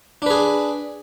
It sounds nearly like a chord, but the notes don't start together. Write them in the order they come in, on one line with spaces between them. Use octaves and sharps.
D4 B4 G#4